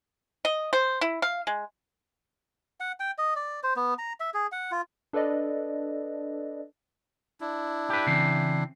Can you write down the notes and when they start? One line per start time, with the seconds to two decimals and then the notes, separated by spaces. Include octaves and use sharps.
0.45 D#5
0.73 C5
1.01 E4
1.22 F5
1.47 G#3
2.80 F#5
3.00 G5
3.18 D#5
3.36 D5
3.63 C5
3.76 B3
3.98 A#5
4.20 E5
4.34 G#4
4.52 F#5
4.71 F4
5.13 D4 A4 B4 D5 D#5
7.41 D4 E4
7.90 G4 B4
8.06 C#3 E3 C4